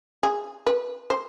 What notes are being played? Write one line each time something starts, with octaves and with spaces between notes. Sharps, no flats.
G#4
B4
C5